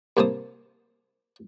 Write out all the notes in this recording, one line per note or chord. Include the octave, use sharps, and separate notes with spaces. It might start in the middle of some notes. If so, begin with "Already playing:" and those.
C2 A#3 C5 A5 D#6